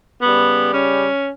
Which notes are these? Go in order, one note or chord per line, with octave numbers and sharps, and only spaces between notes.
C#3 G3 B3
C#4